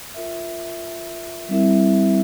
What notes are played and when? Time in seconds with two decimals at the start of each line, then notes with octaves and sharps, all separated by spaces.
0.14 F4 A#4 E5
1.49 G3 C4 E4 A#4 E5